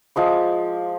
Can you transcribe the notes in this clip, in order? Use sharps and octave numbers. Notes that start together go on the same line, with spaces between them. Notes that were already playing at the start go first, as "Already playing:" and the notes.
F3 G#3 D6